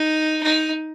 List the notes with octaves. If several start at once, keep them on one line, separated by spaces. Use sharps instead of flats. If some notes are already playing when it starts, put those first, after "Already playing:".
Already playing: D#4
D#4